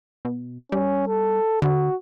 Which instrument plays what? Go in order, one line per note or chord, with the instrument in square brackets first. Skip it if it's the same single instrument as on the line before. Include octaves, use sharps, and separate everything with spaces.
[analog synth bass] B2
[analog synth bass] G3 [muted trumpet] C#4
[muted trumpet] A4
[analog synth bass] D3 [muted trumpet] F#4